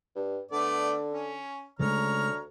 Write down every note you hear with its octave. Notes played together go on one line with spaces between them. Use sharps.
G2
D3 A3 B3 D5
C#4
D2 C#3 G#3 A3 C#5 A#5 F6